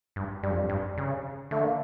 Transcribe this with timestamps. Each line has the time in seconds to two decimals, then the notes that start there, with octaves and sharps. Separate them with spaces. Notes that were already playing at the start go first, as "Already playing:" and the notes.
0.16 G2
0.43 G2 G3
0.51 F2
0.59 G2
0.70 G2
0.98 C#3
1.51 D3 A3
1.62 A#3